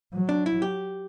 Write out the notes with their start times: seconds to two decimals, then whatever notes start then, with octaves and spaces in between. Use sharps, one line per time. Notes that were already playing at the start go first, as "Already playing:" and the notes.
0.13 F#3
0.29 D4
0.46 E4
0.62 G4